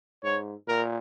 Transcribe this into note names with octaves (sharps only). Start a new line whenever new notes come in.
G#2 C#5
A#2 A#4